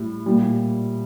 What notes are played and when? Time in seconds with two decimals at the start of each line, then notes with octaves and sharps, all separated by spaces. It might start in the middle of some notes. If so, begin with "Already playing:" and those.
Already playing: A2 G3
0.26 A#2 G3